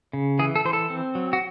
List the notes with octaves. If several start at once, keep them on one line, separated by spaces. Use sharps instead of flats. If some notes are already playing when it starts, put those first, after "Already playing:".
C#3
E3 G#4
A4
E3 C5
A4
C4
F#3
F#4